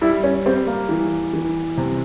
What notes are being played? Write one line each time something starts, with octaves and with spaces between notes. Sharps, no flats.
G3 E4
C#4
G3 C4
A#3
E3
E3
C3